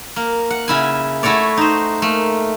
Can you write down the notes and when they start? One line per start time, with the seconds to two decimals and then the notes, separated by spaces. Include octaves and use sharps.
0.16 A#3
0.50 F#5
0.68 C#3 E4 G#5
1.23 A3 E4 F#4 C#5 D5
1.57 D#4 C5
2.02 A3 A#3